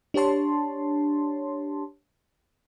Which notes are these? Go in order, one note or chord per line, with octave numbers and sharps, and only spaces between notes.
D4 G4 C#5 A5 C6